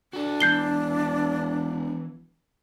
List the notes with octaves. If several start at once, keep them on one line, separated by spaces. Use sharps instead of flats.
D4 F#4 A4
E1 E3 G6 C7 G7